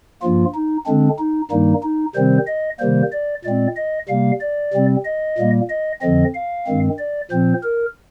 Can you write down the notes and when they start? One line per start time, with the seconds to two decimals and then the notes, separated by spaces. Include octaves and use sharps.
0.22 G2 F3 A#3 F4
0.55 D#4
0.86 D3 G#3 C4 D4
1.19 D#4
1.51 G2 D#3 G3 A#3 D#4
1.83 D#4
2.15 C3 D#3 G3 C4 C5
2.48 D#5
2.80 C3 D#3 G3 A#3 C5
3.13 D5
3.45 A#2 G#3 C4 D5
3.77 D#5
4.09 C3 G3 A#3 F5
4.41 D5
4.74 C3 G3 C4
5.05 D#5
5.38 A#2 G3 A#3
5.70 D#5
6.02 F2 D3 F3 C4 D#5
6.35 F5
6.67 G2 D#3 G#3 C4
6.99 D5
7.31 A#2 F3 C4 C5
7.63 A#4